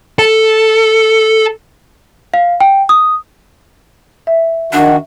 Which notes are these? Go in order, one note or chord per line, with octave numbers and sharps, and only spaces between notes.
A4
F5
G5
D#6
E5
D#3 D4 F#4